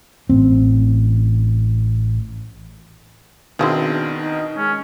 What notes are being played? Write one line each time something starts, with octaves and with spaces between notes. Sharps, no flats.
A1 C4
B2 D#3 C4 D4 E4 G#4
D#4
G#3 C#4